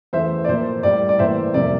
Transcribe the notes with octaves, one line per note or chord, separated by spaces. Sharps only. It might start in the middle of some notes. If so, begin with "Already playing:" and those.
E2 E3 A3 C5 E5
D5
A#2 F3 A#3 C5
A2 G3 A#3 D5
D5
A2 E3 A#3 C5 E5
F2 C3 G3 A#3 D5